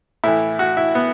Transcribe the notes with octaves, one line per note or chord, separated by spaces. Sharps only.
A2 E3 E4
F#4
E4
B3